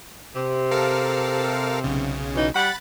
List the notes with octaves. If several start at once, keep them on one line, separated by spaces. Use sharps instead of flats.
C3
A4 A#4 F5
B1 C#3
E3 F#3 D#4
G3 F#5 B5 F#6 A6